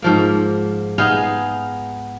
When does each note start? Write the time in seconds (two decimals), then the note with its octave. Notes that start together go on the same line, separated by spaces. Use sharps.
0.02 G#2 F3 A#3
0.98 B3 D#4 G#4 F5